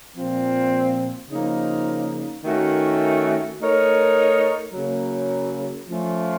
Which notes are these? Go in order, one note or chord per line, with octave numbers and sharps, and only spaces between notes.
A#2 F3 C4
C#3 F3 A#3 D#4
D#3 A3 C#4 F#4 A#4
A3 D#4 A#4 C#5
C#3 F#3 A#3
F3 A3 C#4 F4